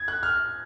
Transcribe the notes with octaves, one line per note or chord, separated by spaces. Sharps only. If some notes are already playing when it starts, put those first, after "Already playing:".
Already playing: G#6
F#6
F6